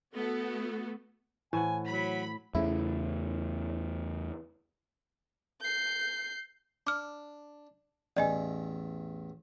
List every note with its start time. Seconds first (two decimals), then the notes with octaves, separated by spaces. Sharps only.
0.12 A3 B3 F#4 A4
1.53 A2 E3 C5 F#5 G#5
1.87 F#3 B5
2.55 E2 C#3 A3 E4
5.61 G6 C7
6.87 D4 D6 F6
8.17 A1 E2 D5 D#5 G#5